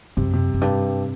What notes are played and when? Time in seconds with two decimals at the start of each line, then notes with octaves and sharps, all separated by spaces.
0.17 F#2 C3
0.34 C3
0.54 F#2
0.61 G2